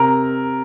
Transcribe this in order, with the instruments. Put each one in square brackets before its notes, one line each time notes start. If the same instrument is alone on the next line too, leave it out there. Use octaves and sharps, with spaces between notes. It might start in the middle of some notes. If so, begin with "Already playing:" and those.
Already playing: [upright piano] C3 A#4 A#5